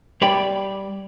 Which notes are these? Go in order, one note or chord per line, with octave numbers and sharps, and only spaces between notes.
G3 C#5 D5 G5 B5